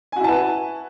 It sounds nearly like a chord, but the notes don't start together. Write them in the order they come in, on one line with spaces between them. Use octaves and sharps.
G#5 F#4 E4 A5 B4